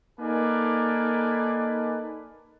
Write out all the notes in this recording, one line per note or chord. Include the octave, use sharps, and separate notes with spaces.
A#3 D#4 A4 B4 D5 G#5